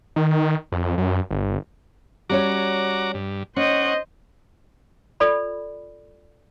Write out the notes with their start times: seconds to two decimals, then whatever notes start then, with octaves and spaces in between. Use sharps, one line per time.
0.16 D#3
0.72 F2
0.98 F#2
1.31 G1
2.29 G3 C#4 F#4 C#5 A#5 D6
3.14 G2
3.56 C#4 C5 D#5 F#5 C#6
5.20 F4 A4 D5 B5